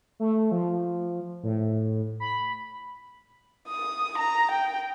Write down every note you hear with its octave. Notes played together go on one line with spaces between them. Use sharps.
A3
F3
A2
B5
D#6
A#5
G5